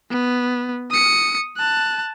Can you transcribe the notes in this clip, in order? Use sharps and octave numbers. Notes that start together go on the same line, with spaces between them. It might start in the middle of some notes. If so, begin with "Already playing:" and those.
B3
D#6 C#7
A5 F#6